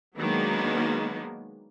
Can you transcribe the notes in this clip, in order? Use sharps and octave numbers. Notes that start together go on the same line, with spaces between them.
D#3 F#3 G#3 A#3 B3 D4